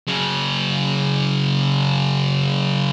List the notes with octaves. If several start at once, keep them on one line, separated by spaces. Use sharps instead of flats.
C#3 F#3